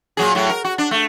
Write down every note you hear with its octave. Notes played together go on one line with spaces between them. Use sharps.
A#2 F#3 G#4
A2 F#3
A#4
F#4
D4
A3